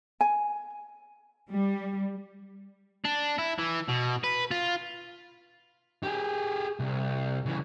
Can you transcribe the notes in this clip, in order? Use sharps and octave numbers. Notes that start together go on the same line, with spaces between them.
G#5
G3
D4
E4
E3
B2
B4
F4
G4 G#4
C2
C#3 E3